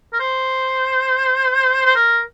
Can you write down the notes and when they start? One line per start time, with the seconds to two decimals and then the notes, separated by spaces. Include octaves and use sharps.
0.13 A#4
0.20 C5
1.86 C5
1.96 A#4